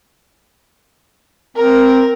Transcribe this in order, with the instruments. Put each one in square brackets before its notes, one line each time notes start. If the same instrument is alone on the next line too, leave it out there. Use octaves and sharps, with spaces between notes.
[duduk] C4 [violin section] A#4